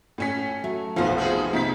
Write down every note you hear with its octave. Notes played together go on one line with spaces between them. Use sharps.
A2 C#4 B6
F#3 A3
F1 B1 F3 B3 C4 F5
C4 F#4 G#4
C3 D#4 E4 B6